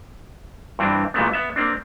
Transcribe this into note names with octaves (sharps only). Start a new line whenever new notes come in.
G2 E3 C4 D4
A#2 E3 G#3 A3 B3
B3 E5
A#3 C4 D4